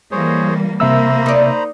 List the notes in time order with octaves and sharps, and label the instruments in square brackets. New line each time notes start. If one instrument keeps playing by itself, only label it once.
[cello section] E3 G3 A#3 [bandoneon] G#4 C5 C#5
[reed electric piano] C3 E5 E6 [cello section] A#3 [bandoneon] C5 A#5 B5
[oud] D#4 D5